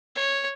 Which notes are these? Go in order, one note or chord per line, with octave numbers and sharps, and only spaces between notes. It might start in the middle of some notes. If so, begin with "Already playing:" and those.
C#5